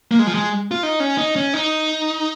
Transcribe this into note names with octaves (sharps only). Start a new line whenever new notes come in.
A#3
G#3
F3
G#3
F4
D#4
C#4
D#4
C#4
D#4